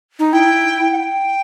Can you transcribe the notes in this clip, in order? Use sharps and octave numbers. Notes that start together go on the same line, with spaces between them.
D#4
E4 G5
F#5
G5